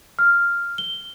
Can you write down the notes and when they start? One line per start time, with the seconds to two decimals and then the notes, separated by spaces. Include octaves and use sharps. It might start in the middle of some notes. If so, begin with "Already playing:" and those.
0.19 F6
0.78 G7